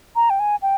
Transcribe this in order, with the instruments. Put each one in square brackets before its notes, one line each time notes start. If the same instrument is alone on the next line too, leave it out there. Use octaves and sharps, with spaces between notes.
[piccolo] A#5
G5
G#5
G5